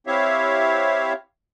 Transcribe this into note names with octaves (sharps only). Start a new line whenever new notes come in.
C4 E4 G4 C#5 E5 F5